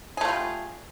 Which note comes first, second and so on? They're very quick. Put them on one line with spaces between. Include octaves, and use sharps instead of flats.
G#4 A3 F4 G3